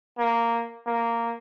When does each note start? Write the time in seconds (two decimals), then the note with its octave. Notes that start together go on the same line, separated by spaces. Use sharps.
0.19 A#3
0.86 A#3